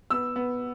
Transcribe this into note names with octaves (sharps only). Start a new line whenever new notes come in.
B3 E6
B3